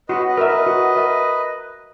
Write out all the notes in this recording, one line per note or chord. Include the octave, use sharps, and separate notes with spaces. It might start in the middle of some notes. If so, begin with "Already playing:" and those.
F#4 B4 D#5
B4 D#5
A#4 E5
B4 D#5
F#4
A#4 E5